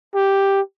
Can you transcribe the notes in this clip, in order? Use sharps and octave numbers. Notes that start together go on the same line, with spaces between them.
G4